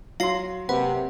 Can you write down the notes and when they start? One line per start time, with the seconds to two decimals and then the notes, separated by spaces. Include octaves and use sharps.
0.20 F#3 F5 C6 C7
0.69 C3 A#3 C4 B4 F#5